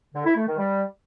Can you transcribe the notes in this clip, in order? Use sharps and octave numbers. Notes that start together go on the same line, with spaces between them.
D3
E4
A3
D#3
G3